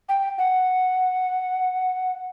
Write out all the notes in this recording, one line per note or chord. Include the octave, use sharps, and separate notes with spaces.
G5
F#5